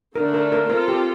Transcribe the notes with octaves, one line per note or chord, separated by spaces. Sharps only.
D3 A3 D4 A#4
A#4
A#4
C4 F4 A4 A#4
G4